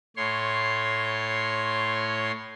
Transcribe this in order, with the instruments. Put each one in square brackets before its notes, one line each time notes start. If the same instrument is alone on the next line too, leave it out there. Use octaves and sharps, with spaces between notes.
[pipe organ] A2 C#5 C6